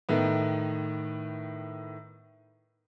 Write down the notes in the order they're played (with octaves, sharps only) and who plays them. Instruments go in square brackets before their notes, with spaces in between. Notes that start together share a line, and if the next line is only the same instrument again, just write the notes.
[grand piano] A2 D#3 B3